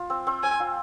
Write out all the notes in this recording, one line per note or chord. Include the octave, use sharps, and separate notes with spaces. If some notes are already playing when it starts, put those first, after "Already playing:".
Already playing: F4
C4
C4
C4 G#5
F4